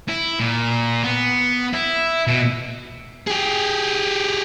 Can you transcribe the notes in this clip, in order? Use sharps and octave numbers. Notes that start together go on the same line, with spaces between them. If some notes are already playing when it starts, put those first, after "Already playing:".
E4
A#2
B3
E4
B2
G4 G#4